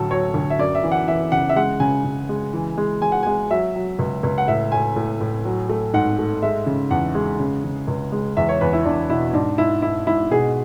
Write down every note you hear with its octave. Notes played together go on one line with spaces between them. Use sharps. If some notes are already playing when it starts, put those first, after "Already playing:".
Already playing: D2 A2 F#3 A4
F#3 C#5
D2
E5
F#2 D5
E5
E3
F#5
E3 E5
C#3 F#5
E5
G#3 F#5
C#3 G#5
C#3
G#3
E3
G#3
G#3 G#5
F#5
G#3 G#5
F#3 E5
F#3
C#2
C#2
F#5
A2 E5
A2 G#5
A2
A2
F#3
A3
G#2 F#5
A3
G#3 E5
C#3
E2 F#5
G#3
C#3
C#3
C#2
G#3
E2 E5
C#5
E2 B4
E4
E2 D4
B2 E4
G#2 D4
G#2 E4
G#2 E4
G#2 E4
B2 G#4